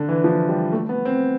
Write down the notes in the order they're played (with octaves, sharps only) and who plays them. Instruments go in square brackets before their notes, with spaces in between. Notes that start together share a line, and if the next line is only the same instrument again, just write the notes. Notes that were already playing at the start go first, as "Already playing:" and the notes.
Already playing: [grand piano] D3
E3
F3
G3
A3
B3
C4